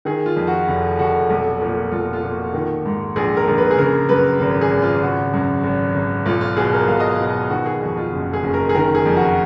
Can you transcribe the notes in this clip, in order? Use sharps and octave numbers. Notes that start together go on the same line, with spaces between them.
D#3 G#4
F4
F2
F#4
F1
F1 F#4
B1
A#2
B1 F4
F4
A#2
F#4
D#3
G#2
A#1 G#4
A#4
A#1
B4
G#4
C#3 A#4
F#2 B4
G#1 A#4
G#4
G#1
F4
C#3 F#4
F#2
G#1
G#1
B1 F4
F4
B2 G#4
A#4
B1 F5
D#5
F5
B2
D#3 F#4
G#4
F2 F#4
F4
F#1
G#4
F#1
A#4
G#4
D#3 A#4
G#4
F2
F#4